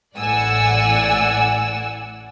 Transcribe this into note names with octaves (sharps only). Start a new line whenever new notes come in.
A1 A2 D5 F#5 G#5 E6